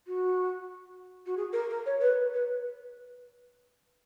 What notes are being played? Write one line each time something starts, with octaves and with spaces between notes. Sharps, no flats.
F#4
F#4
G#4
A#4
A#4
C#5
B4
B4